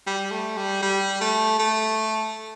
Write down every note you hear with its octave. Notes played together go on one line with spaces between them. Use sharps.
G3
A3
G3
G3
A3
A3